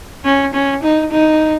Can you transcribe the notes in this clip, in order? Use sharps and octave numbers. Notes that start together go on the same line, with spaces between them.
C#4
C#4
D#4
D#4